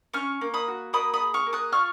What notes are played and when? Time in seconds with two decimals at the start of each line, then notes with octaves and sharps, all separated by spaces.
0.14 C#4 C#6 F6
0.41 A#3
0.54 B5 D#6
0.68 F#4
0.93 A#3 B5 D#6
1.14 B5 D#6
1.20 G#4
1.34 C#6 F6
1.46 A#3
1.53 D#6 F#6
1.73 F4 C#6 F6